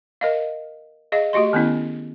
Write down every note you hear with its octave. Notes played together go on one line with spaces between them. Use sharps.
A#4 D#5 F5
G#4 D#5 F5
A3 F#4 G4 D#5 C6
D#3 B3 C#4 E4